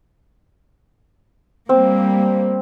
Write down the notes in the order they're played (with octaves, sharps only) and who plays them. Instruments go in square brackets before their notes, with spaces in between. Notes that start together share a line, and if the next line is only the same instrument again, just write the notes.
[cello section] G3 A#3 [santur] C4